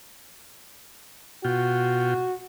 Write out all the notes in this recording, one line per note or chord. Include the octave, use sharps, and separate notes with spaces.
B2 F4 F#4 G5